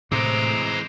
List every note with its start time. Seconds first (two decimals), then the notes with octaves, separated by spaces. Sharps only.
0.12 A2 C3 E3 G#3 C5 A#5 D6